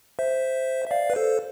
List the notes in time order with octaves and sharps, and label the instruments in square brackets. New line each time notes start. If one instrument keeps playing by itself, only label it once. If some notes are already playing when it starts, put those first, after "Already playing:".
[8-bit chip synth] C5 E5
E5
D5 F5
B4
A4 C5